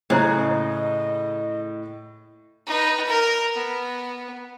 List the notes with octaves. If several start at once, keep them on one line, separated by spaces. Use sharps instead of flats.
A2 C#3 G#4 C5 D#5 A#5
D#4 B4
A#4
B3